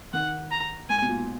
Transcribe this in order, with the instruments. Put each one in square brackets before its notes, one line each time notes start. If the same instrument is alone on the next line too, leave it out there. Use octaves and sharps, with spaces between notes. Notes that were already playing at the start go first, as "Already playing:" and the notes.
[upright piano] D#3 [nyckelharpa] F#5
[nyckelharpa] A#5
[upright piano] G#2 [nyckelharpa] G#5
[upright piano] B2
A#2